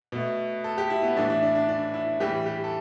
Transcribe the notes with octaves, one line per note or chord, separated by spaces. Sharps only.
B2 A3
A4
G4
E4
B3
A2 E3 A3 D4
E4
D4
D4
D4
E4
A2 E3 G3 G4
G4
A4